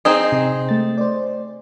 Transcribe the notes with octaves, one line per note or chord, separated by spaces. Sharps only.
C4 D#4 G#4
C3
A3 A6
C5 D5